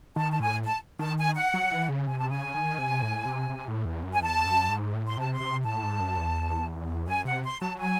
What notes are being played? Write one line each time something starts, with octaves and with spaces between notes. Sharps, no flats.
D#3 A5
A5
A2 G#5
A5
D#3 A5
G#5
F#5
F#3
E3
C#3
C3 G#5
A5
C#3 G#5
D#3
C3
A2
C3
C3
A2
E2
F#2
G#5
E2 A5
F#2
G#2
A2
C6
C3 A5
C6
C3
A2 A5
G#2
F#2
E2
F#2 G#5
C3 F#5
C6
F#3 A5
G#5